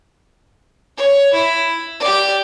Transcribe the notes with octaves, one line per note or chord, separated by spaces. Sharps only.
C#5
E4
G4 D5